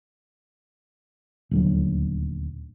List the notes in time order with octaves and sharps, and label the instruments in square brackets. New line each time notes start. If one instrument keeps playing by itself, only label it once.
[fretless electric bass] D#1 D2 F#3